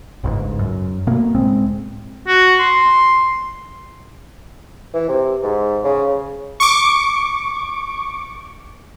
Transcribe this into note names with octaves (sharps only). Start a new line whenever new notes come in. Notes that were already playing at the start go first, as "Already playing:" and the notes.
G1 C#2 G#2
F#2
B2 A3 A#3
C#2 A2 G#3 C4
F#4
C6
E3
C3
G#2
C#3
C#6 D6